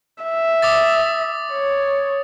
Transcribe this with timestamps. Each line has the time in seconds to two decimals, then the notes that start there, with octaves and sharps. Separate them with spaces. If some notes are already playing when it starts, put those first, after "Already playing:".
0.23 E5
0.62 D6 D#6 A6
1.52 C#5